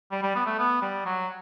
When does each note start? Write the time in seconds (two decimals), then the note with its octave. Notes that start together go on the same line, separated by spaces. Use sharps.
0.12 G3
0.23 G3
0.35 B3
0.46 A3
0.59 B3
0.82 G3
1.06 F#3